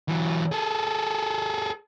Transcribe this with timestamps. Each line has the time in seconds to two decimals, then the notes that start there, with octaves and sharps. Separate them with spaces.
0.09 E3 F#3
0.52 G#4 A4